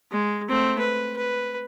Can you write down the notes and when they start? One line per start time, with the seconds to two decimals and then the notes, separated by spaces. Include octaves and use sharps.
0.12 G#3
0.48 A3 C4
0.78 B4
1.17 B4